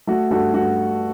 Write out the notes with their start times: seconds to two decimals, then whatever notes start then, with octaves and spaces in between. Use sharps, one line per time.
0.07 A3 F#4
0.31 G2 F#4 A4
0.54 G2 F#4